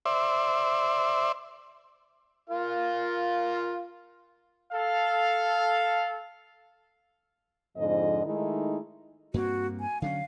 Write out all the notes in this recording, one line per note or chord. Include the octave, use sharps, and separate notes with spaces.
C5 D5 E5
F4 A#4 F5
A4 F5
F2 G#2 D3 F3 D#5
D#3 G#3 A3 D#4 E4
G2 A#3 C4 F#4
G#5
D3 F#3 C#4 F5